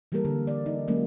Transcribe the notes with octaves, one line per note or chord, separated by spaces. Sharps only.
E3 G3 A#3 A4 A#4
D3
D5
D#4
F#3 G#3 A#3 C#4